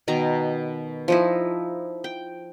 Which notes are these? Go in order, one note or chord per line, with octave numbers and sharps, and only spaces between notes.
B2 D#3 A#5
F3 D#4 E4
G5